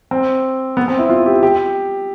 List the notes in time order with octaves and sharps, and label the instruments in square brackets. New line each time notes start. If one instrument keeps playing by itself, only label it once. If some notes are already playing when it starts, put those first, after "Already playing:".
[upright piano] C4
B3
C4
E4
F4
G4
G4